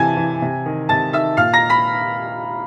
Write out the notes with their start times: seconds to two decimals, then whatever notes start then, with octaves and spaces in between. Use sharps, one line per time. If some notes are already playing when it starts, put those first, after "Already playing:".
Already playing: C3 E3 G#5 A5 G#6
0.17 E3
0.42 C3
0.66 D#3
0.89 C3 A5 A6
1.13 D#3 E5 E6
1.37 A#2 F5 F6
1.53 A#5 A#6
1.70 B5 B6